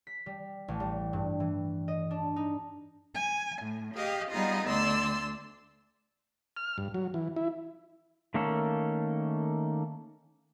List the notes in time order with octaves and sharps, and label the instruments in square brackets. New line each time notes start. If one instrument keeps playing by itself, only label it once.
[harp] B6
G3
A1
G3
G2
E3
D#5
D4
D#4
[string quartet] G#5
A2
G4 G#4 D#5 F5
G3 B3 D#4 F4 G#4 D#5
D2 D5 C6 E6
[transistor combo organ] F6
G2
F#3
E3
E4
[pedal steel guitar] D#3 A3 A#3 C#4 A4